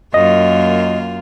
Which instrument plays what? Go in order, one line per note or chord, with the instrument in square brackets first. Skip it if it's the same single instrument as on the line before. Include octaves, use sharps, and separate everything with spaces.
[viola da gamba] F#2 A#3 F4 [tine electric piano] D#5